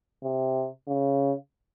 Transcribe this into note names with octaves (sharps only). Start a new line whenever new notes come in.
C3
C#3